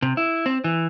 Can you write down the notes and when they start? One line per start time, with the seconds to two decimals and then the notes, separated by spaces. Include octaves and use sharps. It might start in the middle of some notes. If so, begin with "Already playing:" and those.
0.02 C3
0.17 E4
0.46 C4
0.64 E3